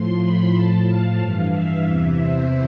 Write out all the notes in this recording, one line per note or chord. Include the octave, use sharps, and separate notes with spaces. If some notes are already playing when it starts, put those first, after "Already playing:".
Already playing: A2 F3 C6
B5
A2 F3 A5
F5
G2 E3
E5
E2 C3 E3
C5